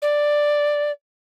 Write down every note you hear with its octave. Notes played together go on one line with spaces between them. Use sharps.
D5